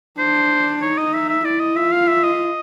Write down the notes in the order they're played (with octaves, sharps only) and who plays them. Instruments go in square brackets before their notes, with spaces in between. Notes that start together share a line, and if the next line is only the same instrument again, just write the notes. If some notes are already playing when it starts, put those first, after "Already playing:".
[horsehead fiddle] D4 [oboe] C5
[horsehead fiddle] D#4 [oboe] C#5
[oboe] D#5
E5
E5
[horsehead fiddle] E4 [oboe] D5
[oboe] D#5
[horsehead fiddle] F4 [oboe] E5
[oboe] F5
E5
D#5